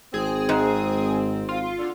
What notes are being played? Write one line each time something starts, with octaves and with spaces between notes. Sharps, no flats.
G#1 C4 G#4
G#2
F4
D3